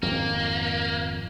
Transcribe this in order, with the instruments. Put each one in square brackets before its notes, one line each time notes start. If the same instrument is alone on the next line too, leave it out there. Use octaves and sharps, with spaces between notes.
[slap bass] F2 G#2 D#3 [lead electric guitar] A#3